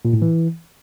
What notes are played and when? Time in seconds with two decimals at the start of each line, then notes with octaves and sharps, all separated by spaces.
0.05 A#2
0.13 A2
0.22 E3